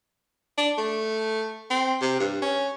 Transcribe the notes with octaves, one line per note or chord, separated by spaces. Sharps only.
D4
A3
C4
C3
G2
C#4